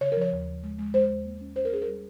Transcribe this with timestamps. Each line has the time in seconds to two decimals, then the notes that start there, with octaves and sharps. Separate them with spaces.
0.01 C#3 C#5
0.12 A#4
0.17 F3 C#5
0.32 D#2
0.48 F3
0.63 G#3
0.79 G#3
0.94 G#3 C5
1.10 D#2
1.25 A#3
1.41 C#4
1.56 C#4 C5
1.65 A#4
1.72 C#4 G#4
1.82 A#4
1.87 G3